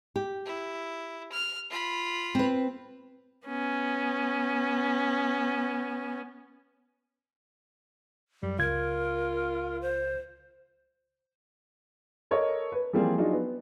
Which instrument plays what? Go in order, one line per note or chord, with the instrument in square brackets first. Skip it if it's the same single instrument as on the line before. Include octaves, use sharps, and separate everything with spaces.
[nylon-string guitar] G4
[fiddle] E4
F6
F4 B5
[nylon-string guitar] C4 B4
[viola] B3 C#4
[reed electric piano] F#2 [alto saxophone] G3
[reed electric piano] C#2 G#6 [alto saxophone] F4 [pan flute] A#4
[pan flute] C5
[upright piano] A4 A#4 C#5 D#5
B4
E3 F3 G3 A#3 C4 G#4
F#3 D4 D#4 F4 G#4
B3